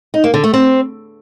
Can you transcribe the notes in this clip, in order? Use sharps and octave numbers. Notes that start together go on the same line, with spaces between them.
D#4
A#3
D3
A3
C4